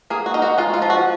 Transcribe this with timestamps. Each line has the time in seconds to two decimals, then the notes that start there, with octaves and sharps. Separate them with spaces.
0.10 A#3 G#4
0.26 F#4
0.34 D#4
0.42 F#4
0.58 G#3 F4
0.74 F4
0.82 F3
0.90 F#4